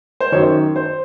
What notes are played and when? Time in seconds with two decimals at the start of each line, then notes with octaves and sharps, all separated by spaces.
0.20 C5
0.32 F#2 D#3 C#5
0.76 C5